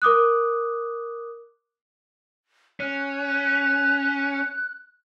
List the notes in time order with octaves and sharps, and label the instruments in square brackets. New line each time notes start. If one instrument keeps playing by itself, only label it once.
[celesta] A#4 D6 D#6 F#6
[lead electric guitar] C#4 [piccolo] F#6